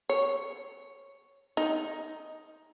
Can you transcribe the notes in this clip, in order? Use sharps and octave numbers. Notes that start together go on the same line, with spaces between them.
C#5
D#4